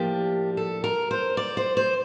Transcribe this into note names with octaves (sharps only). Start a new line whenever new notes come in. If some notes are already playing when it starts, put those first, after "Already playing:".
Already playing: A2 F3 A#3 D4 G4
A4
A#4
C5
D5
C5
C5